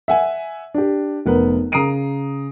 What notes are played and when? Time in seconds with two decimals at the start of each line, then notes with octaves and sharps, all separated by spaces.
0.08 E5 F#5 G#5
0.74 D4 G4
1.26 F1 B3 A#4 B4
1.72 C#3 A#5 D#6 C7 D7 D#7